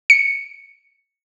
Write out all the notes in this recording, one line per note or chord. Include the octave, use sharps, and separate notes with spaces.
C#7